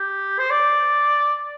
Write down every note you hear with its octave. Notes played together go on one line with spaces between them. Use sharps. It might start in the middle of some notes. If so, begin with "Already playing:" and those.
Already playing: G4
C5
D5